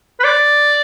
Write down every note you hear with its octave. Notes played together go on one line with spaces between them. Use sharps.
B4
D5